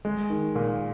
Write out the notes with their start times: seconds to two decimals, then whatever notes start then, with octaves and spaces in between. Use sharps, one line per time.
0.05 G#3
0.30 D#3
0.56 A#2